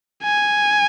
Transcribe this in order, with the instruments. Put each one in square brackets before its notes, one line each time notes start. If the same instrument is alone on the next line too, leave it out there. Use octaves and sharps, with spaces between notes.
[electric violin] G#5